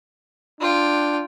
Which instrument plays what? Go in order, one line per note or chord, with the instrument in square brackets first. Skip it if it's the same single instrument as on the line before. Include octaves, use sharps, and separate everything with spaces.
[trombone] D4 [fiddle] F4 G5